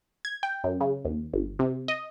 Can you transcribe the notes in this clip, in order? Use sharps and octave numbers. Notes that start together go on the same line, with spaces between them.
G#6
G5
F#2
C#3
D#2
G1
C3
D#5